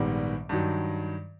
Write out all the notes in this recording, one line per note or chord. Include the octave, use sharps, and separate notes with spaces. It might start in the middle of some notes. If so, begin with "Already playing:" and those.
Already playing: A#1 G#2 D#3 G3 B3 D6
G2 D#3 F#3